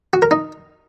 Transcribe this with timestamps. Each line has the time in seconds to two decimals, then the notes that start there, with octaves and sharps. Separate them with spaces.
0.13 F#4
0.22 A#4
0.31 D#4